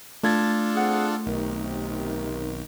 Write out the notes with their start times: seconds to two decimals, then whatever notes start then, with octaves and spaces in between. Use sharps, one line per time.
0.23 A3 D4 F4 A4 G#6 A6
0.75 C4 G#4 F#5
1.26 B1 C3 D#3